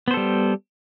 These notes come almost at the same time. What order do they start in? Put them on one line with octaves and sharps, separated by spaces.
B3 C5 A4 G3